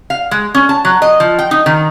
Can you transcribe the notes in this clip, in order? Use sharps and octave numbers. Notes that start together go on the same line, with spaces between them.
F5
G#3
C#4
A5
F#3
D#5
F3
G5
D#4
D#3